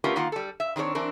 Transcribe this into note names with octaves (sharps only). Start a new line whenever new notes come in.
A3 B3 C#4 F4 G4 A#4
D#3 A#3 F4 F#5
G3 A4
E5
D#3 C4 D4 A#4 C#5
E3 C4 D4 A#4